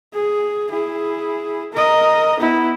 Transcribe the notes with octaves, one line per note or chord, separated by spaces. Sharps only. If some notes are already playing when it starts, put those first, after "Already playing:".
G#4
E4 G#4
A#4 D#5
B3 E4